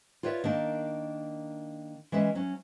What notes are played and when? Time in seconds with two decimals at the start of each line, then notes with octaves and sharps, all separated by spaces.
0.23 F4 B4 C#5 D5 E5
0.44 D#3 A#3 D4
2.12 E3 G#3 C#4 E5
2.35 F#3 C#4